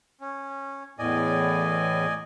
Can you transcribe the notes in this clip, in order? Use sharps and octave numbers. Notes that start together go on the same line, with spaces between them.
C#4
E2 A2 D5 D#5 G#5